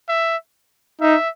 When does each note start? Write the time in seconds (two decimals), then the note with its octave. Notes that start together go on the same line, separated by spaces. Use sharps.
0.09 E5
1.01 D#4 E5